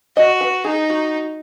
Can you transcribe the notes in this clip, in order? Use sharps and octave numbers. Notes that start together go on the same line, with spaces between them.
F#4 D#5
B4
D#4 G#4
F#4